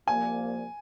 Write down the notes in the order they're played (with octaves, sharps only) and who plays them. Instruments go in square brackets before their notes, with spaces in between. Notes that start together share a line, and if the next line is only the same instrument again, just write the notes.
[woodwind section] C2 A#2 F3 A#3 [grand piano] G#5